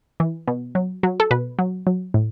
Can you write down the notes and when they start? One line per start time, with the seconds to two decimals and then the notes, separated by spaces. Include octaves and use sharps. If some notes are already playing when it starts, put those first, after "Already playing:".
0.20 E3
0.47 B2
0.75 F#3
1.03 F#3
1.20 A4
1.31 B2 B4
1.59 F#3
1.87 F#3
2.14 A2